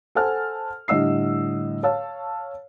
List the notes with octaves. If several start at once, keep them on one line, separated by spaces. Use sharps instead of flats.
A4 C5 F#5 G#5 A5 F6
A2 D3 G3 D#5 E6 C7
C#5 F5 A5 E6